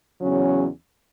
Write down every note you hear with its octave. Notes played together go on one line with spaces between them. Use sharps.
E2 C#3 F#3 C#4